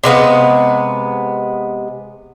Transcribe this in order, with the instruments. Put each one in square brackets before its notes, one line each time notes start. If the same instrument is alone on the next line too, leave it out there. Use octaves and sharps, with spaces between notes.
[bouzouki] C3 G#3 B3 F5